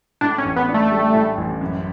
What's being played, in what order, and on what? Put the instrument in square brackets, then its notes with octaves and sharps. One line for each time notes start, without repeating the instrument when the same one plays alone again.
[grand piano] A2 [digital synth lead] D4
[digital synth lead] C#4
[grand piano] A1
[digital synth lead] B3
[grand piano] D4
[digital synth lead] A3
[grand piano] G3
A2
A1
F#2